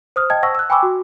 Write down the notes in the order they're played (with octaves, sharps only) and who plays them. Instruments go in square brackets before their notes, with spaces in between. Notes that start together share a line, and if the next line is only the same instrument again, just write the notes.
[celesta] C5 D#6 F6
D#5 G5 A5 G#6
C5 F#5 A5 C#6 E6 A#6
E6 F#6
G5 G#5 B5 C#6 D6 E6
F#4